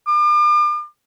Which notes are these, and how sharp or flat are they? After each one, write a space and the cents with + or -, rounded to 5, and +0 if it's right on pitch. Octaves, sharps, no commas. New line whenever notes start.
D6 +40